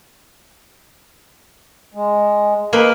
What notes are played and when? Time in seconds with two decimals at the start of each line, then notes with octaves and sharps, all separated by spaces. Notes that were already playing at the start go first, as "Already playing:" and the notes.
1.94 G#3
2.73 A#3 B4 D#5